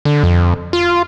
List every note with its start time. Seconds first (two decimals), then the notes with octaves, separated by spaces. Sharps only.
0.05 D3
0.23 F2
0.73 F4